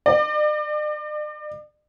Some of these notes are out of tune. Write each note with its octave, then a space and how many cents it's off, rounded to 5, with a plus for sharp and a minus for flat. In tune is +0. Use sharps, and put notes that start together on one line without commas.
D5 +40